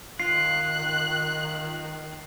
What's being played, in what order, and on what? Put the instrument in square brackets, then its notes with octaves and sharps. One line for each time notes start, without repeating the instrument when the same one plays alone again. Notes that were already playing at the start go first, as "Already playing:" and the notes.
[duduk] D#3 [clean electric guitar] F4 [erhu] F#6 [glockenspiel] C7